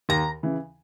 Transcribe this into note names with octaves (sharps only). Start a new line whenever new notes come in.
D#2 A#5
C#3 E3